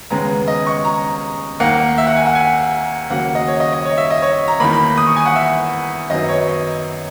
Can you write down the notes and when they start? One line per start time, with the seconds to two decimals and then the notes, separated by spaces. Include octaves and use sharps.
0.10 D#2 C#3 G#3 B3 A#5
0.47 D#5
0.67 C#6
0.85 A#5
1.60 D#2 D#3 A#3 F#5
1.98 E5
2.07 F#5
2.16 G#5
2.26 F#5
2.35 G#5
3.10 D#2 C#3 F#3 A#3 F#5
3.35 D#5
3.48 C#5
3.60 D#5
3.72 D#5
3.85 C#5
3.97 E5
4.10 D#5
4.22 C#5
4.48 A#5
4.60 E2 D#3 A#3 B5
4.73 B5
4.97 D#6
5.07 C#6
5.16 G#5
5.25 F#5
5.35 E5
6.10 F#2 D#3 F#3 B3 D#5
6.28 C#5
6.48 D#5